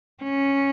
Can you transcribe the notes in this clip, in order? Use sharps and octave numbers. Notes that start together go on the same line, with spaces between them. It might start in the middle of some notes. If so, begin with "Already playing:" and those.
C#4